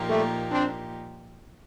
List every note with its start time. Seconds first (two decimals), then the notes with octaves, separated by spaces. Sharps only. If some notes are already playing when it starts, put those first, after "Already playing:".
Already playing: A#2 F3 A#3 D#4 G4
0.09 G3 A3
0.52 C4 D4